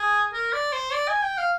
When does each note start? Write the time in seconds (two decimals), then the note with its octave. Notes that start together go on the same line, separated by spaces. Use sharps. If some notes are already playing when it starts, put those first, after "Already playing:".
Already playing: G#4
0.33 A#4
0.53 D5
0.73 C5
0.93 D5
1.08 G#5
1.22 G5
1.38 F5